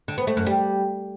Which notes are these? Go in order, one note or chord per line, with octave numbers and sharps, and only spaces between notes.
D3
B3
A3
F#2
G3